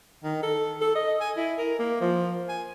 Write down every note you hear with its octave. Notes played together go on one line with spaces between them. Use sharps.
D#3
A4
A4
D#5
G#5
E4
A#4
A#3
F3
G#5